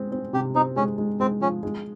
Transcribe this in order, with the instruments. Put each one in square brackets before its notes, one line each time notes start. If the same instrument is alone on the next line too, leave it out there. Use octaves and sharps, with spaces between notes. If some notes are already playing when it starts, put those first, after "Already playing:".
Already playing: [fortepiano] G#3 C4
C4
[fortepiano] C3 [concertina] G4
[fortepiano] C4 [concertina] D#4
[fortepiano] G#3 [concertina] C#4
[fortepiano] G#3
[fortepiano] G#3 [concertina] C4
[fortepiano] F3 [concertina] C#4
[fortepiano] G#3